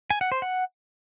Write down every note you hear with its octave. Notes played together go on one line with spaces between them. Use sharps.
G#5
F#5
C5
F#5